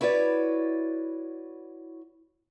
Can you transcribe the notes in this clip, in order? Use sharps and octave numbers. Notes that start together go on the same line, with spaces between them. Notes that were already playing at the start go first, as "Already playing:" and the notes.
E4 F#4 B4 C#5 D5